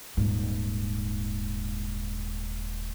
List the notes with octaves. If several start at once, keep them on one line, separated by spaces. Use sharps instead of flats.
D#1 G#2